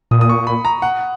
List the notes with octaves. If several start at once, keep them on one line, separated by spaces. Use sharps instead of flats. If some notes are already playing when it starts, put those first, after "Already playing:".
A#2 D#6
D#6
C#6
B5
A#5
F#5